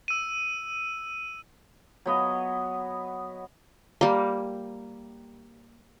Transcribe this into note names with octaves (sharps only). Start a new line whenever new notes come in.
E6 D#7
F#3 B3 D#5
G3 A#3